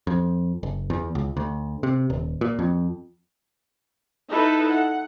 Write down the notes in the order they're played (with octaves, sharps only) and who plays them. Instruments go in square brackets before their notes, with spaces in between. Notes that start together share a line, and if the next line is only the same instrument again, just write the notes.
[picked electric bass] F2
F#1
E2
C#2
D2
C3
D#1
A#2
F2
[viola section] D#4 E4 A4 B4
F#5